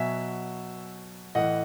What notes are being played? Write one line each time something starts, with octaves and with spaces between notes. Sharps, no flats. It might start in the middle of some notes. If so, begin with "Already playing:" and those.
Already playing: B2 F#3 E5 G#5
A2 E3 D#5 F#5